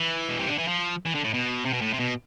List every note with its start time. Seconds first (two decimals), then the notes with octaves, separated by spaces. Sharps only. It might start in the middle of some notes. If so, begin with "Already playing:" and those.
Already playing: E3
0.29 B2
0.39 C3
0.49 D3
0.58 E3
0.68 F3
1.06 E3
1.15 D3
1.24 A2
1.34 B2
1.65 C3
1.73 B2
1.81 A2
1.93 C3
2.00 B2